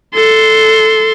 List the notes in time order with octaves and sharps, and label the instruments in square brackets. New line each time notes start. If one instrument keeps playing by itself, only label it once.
[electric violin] A4 C6